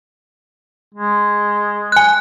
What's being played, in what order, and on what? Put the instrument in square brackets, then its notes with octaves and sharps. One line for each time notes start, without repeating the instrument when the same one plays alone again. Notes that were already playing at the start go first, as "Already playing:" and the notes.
[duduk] G#3
[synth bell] G#5 F#6